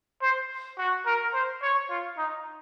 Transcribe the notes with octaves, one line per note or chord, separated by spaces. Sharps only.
C5
F#4
A#4
C5
C#5
F4
D#4